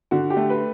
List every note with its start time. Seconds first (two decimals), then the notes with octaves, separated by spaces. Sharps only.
0.11 D3 F#4
0.30 G4
0.36 A3
0.50 B4